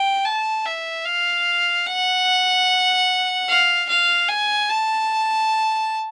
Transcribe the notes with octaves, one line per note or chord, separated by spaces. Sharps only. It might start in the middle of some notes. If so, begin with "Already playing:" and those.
Already playing: G5
A5
E5
F5
F#5
F5
F5
G#5
A5